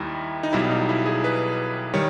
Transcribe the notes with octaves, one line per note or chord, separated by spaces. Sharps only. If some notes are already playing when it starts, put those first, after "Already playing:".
Already playing: D#2 D#3 G3 D#4 E4
D#4
B1 B2 G3 E4
D#4
E4
G#4
B4
D#3 G3 C#5